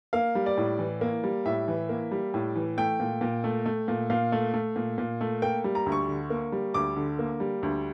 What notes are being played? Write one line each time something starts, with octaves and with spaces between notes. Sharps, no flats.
A#3 F5
G3
D5
A2
E3
A#3
G3
A2 E5
E3
A#3
G3
A2
E3
A3 G5
A#2
A#2
A3
A3
A#2
A#2 F5
A3
A3
A#2
A#2
A3
A#3 G5
G3
A#5
D2
C#6
D3
A#3
G3
D2 D6
D3
A#3
G3
D2